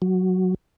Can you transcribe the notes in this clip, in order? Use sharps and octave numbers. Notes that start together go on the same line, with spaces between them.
F#3